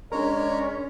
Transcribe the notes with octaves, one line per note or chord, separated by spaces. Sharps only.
G#3 C#4 D4 A#4 C#5 D5 A#5